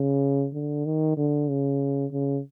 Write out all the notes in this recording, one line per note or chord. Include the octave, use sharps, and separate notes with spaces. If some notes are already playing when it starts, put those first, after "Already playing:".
Already playing: C#3
D3
D#3
D3
C#3
C#3